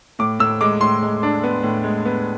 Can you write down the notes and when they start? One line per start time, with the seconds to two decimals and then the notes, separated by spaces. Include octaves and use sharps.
0.19 A2 D6
0.39 A2 E6
0.61 G#3 D6
0.81 A2 C6
1.02 G#3
1.23 D4
1.44 B3
1.63 A2
1.84 G#3
2.05 B3